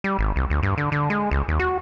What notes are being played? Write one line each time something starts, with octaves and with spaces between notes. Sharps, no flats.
G3
G#1
C2
D2
G2
D3
D3
G#3
C#2
D#2
F#4